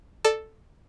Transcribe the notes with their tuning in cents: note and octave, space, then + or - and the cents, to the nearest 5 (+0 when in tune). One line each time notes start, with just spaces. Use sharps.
A4 +0 D5 +25